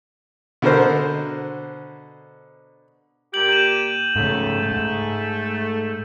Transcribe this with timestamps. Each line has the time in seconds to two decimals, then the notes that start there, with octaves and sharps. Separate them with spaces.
0.62 B2 D3 A#4 C5
3.33 A#2 G4 G6 F#7
3.49 G6 D#7 E7
4.15 G#2 C#3 A3
4.71 G#2